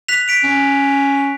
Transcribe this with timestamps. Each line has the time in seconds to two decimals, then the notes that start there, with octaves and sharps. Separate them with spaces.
0.08 F#6 B6 F7
0.28 B6 D7 F7
0.43 C#4